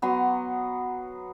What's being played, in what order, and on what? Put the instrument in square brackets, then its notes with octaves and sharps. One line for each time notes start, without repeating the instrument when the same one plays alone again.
[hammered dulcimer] F#3 B3 A#5 C6